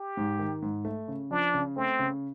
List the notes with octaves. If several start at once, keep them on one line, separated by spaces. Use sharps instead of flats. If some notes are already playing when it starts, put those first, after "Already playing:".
Already playing: G4
G#2
D#3
G#2
A3
C#3
F3 D4
C#3
A3 C4
C#3